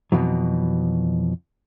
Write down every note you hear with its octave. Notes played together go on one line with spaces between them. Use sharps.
F2 B2 E3 F#3